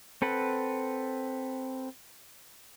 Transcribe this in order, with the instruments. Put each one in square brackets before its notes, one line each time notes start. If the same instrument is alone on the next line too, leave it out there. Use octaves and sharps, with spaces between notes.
[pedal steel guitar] C4 A4 B4 F#5